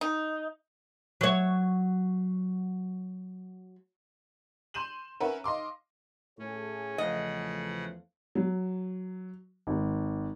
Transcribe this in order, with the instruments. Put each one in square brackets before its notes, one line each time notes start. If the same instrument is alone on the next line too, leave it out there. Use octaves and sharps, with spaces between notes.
[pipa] D#4
[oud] F#3 C#5
[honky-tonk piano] C6 G6 D#7 E7 F#7
C#4 A#4 B4 C#5 E5 F#5
D#5 F5 C6 D6
[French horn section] A2 G#4 A4 [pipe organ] C#4
[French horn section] E2 F3 A3 [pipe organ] C#3 F#5 [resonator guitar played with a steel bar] D#5
[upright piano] F#3
G#1